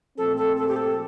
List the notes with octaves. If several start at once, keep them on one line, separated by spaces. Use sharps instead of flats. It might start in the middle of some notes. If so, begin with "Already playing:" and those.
A#2 F3 A3 C4 A4
A4
A4
G4
A4